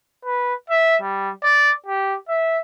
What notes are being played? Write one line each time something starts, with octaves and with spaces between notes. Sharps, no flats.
B4
E5
G3
D5
G4
E5